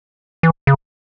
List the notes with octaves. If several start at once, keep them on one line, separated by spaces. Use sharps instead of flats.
E3
C#3